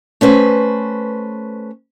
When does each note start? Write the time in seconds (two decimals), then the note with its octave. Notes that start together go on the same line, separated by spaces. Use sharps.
0.21 A3 C#4 B4 C5